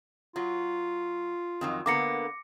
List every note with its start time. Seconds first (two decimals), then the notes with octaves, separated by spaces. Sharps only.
0.36 F#3 F4
1.61 F2 D#3 F#3
1.86 D3 A#3 B3 D6 A#6 C#7